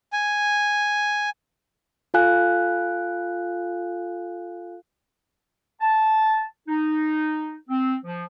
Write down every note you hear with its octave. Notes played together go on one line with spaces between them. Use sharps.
G#5
F4 A4 F5 G#5 F#6
A5
D#4
C4
F3